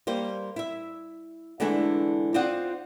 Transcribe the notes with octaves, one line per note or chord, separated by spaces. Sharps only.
G3 A#3 C5
E4 E5
D3 E3 G#3 A3 D4
C4 D#4 F4 C5 D5 F#5